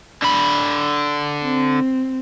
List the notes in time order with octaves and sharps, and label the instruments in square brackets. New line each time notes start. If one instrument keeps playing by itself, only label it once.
[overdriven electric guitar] D3 B5
[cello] C4